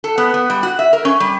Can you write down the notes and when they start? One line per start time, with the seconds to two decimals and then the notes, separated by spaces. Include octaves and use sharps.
0.04 A4
0.18 B3
0.34 B3
0.50 G3
0.63 F#4
0.79 E5
0.93 A#4
1.05 C#4
1.20 G3